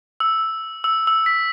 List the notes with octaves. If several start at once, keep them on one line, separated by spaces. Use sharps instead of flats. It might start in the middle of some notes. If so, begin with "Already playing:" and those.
E6
E6
E6
B6